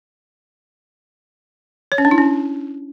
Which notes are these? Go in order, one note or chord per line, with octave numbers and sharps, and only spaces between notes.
C#5
C#4
D4
E4
C#4